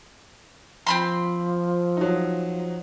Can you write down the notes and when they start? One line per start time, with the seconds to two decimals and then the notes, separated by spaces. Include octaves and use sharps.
0.87 F3 C4 B5 C6
1.97 F#3 D#4